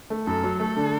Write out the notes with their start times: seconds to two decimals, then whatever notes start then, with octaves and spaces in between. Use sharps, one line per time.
0.10 A3
0.27 F#2 A4
0.44 F#3
0.60 A3 A4
0.76 D3